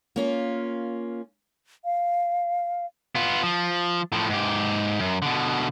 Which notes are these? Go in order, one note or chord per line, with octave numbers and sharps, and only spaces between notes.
A#3 C#4 F4
F5
B3 F4
F3
A2 F3
G#2 G4
F#2
B2 D3